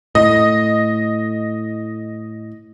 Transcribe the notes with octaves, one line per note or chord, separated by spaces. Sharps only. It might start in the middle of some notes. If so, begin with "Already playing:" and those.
A2 D#5